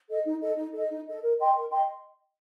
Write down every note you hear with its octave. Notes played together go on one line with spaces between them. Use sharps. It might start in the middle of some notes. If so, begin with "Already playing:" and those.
A4 D#5
D#4
A4 D#5
D#4
A4 D#5
D#4
A4 D#5
A#4
D#5 G5 C6
A#4
D#5 G5 C6